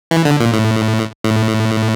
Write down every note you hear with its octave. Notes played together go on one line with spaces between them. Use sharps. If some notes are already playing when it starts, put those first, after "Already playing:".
E3
D3
A#2
A2
A2